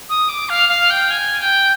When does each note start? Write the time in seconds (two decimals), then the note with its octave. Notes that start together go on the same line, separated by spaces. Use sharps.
0.09 D#6
0.29 D6
0.49 F5
0.69 F5
0.90 G5
1.11 G#5
1.40 G5